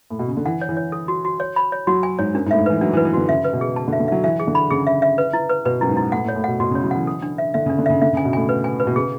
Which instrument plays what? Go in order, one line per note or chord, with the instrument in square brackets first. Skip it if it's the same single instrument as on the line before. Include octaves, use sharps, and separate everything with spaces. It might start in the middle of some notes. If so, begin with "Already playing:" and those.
[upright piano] A2
B2
C#3
D3
[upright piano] E3 [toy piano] F#5
[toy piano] C#5
[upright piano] E3
[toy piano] C#5
A4
F#4
F#4
C#5
B5
C#5
[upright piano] F#3 [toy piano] F#4
[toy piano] G#5
[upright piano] G#2 [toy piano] C#5
[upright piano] F#2 [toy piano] D4
[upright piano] G#2
[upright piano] A2 [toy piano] E5
[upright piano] G#2
[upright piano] E3 [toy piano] B4
[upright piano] F#3 [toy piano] D4
[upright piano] E3
[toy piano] B4
[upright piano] E3
[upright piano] D3 [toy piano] F#4
[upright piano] C#3 [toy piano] E5
[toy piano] B4
[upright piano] B2
[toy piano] G#4
A5
[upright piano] D3
[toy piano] E5
[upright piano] D3
[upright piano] F#3 [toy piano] E5
[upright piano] E3 [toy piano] E5
[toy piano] G#4
[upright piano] D3
[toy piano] B5
[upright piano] C#3 [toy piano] G#4
[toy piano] E5
E5
B4
E4
B4
[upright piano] B2 [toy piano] B4
[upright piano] F#2 [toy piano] E4
[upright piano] G#2
[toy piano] E4
[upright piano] A2 [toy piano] F#5
[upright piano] A2
[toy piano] C#5
[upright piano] A2
[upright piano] B2 [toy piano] F#5
[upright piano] B2 [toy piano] F#4
[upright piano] C#3
[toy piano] C#5
[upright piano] F#3
[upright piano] E3 [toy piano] F#5
[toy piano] A4
D4
E5
[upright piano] D3 [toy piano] E5
[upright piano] C#3
[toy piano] D4
[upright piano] D3
[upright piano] C#3 [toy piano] E5
[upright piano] D3 [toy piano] E5
[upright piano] C#3
[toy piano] G#5
[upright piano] B2
[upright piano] A2 [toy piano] G#5
[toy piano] B4
G#5
B4
[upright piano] B2
[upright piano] C#3 [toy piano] G#4